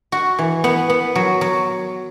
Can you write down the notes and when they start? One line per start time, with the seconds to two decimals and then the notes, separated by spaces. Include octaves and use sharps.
0.12 F#4
0.39 E3
0.64 B3
0.90 B3
1.15 F#3
1.41 F#3